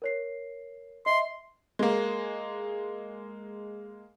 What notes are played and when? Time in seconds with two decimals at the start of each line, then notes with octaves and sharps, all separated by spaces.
0.02 A#4 C#5 C7
1.06 D#5 E5 C6
1.79 G#3 A#3